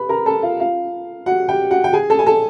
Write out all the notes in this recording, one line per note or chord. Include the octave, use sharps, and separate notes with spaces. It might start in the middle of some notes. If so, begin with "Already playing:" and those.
Already playing: B4 B5
A#4 A#5
A4 A5
F4 F5
F4 F5
F#4 F#5
G4 G5
F#4 F#5
G5
G#4 G#5
A4 A5
G#5
A4 A5